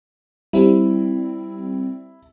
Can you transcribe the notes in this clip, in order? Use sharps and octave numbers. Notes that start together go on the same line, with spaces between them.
G3 C4 E4